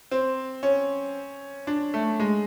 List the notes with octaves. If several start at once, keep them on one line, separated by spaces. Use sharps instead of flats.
C4
C#4
D4
A3
G#3